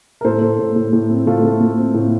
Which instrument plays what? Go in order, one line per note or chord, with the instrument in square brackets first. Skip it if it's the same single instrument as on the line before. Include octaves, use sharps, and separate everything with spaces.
[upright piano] A#4
A2 A4 C5
A3
A2
A2
A2
C4
A3 F4 A4
A3
A3
C4
A2